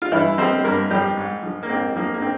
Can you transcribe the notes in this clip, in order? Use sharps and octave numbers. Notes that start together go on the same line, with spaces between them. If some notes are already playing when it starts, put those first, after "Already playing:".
F4
G2 E3 E4
F3 C4 C5
G2 A#3 A#4
F3 G3 G4
G#2
F3
A#3
G#2 C4
F3 A#3
A#3
C4